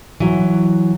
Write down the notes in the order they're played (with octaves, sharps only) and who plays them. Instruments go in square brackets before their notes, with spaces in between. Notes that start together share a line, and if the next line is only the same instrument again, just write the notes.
[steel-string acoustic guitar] E3 F#3